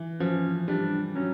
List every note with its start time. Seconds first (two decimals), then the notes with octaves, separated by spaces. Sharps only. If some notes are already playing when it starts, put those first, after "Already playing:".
Already playing: E3
0.20 F3 C#4
0.68 G3 D4
1.15 F#3 C#4